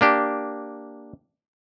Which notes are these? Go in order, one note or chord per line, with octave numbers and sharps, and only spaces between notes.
A#3 D4 G4